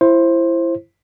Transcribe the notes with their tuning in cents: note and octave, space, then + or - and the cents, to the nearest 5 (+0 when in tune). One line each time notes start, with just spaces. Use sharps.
E4 +25 C5 +15